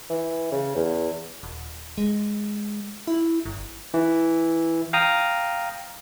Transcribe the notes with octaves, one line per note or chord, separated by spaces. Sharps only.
E3
C#3
E2
D#1
G#3
E4
G1
E3
F5 G5 A#5 D#6